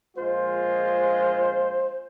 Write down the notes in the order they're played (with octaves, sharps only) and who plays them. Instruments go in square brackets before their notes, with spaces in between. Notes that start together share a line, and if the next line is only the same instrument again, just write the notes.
[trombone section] A#1 G#3 F4 [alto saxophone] C5